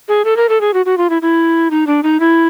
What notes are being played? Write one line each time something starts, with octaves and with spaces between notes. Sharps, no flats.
G#4
A4
A#4
A4
G#4
F#4
F#4
F4
E4
E4
D#4
D4
D#4
E4